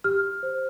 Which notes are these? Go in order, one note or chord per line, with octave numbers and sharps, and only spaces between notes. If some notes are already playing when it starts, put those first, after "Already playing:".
G4 F6
G4
C5